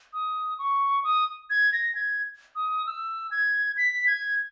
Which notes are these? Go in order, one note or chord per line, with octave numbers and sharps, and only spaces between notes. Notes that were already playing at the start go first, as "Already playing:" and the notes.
D#6
C#6
D#6
G#6
A#6
G#6
D#6
E6
G#6
B6
G#6